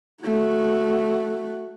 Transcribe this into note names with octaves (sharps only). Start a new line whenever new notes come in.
A3 F#4